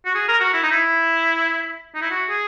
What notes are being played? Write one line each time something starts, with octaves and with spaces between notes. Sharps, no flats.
F#4
G#4
A#4
F#4
E4
D#4
E4
D#4
E4
F#4
G#4